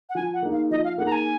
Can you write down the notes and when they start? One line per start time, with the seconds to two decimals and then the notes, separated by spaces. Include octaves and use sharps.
0.09 F#5
0.15 F3 G#5
0.33 F#5
0.42 A#3 D#4 G#4
0.52 F5
0.71 F3 D#5
0.84 F5
0.98 A#3 D#4 G#4 F#5
1.06 A#5
1.12 G#5